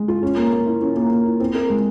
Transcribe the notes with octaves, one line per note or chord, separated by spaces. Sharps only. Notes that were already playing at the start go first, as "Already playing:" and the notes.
Already playing: G#3
F4
C#4
A#3
A#3
E4
C#4
A#3
A#3
E4
C4
A#4
G#3